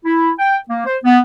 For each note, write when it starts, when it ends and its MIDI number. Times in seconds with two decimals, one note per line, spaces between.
0.05 0.31 64
0.39 0.58 79
0.69 0.86 58
0.86 0.98 72
1.04 1.20 59